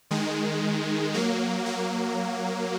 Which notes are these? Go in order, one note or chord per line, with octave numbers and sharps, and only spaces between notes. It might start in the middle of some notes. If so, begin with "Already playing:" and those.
D#3 G#3
F#3 A#3
F#3 A#3